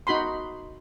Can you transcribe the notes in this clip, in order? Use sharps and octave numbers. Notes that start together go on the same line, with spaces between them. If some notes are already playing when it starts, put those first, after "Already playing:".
D#4 F#4 B5 C6